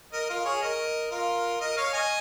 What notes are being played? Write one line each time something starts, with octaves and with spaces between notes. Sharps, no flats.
A#4 D#5
F4 A#4
G#4 C#5
A#4 D#5
F4 A#4
A#4 D#5
C#5 F5
D#5 G#5